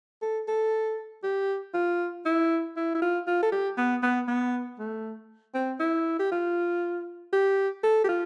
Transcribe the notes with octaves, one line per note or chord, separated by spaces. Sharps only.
A4
A4
G4
F4
E4
E4
E4
F4
F4
A4
G4
B3
B3
B3
A3
C4
E4
G4
F4
G4
A4
G4
F4